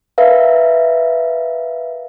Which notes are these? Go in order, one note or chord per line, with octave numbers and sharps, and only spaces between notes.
A#4 B4 E5 F5